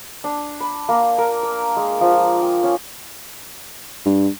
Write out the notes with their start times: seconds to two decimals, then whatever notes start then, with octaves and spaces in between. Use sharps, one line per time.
0.24 D4
0.60 B5
0.89 A#3
1.18 A#4
1.43 E6
1.77 G#3
2.01 F3
2.42 G5
2.63 C#4
4.06 G2